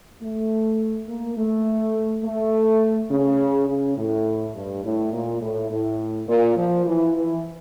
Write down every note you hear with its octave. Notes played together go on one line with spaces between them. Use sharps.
A3
A#3
A3
A3
C#3
C#3
A2
G2
A2
A#2
A2
A2
A#2
F3
E3
E3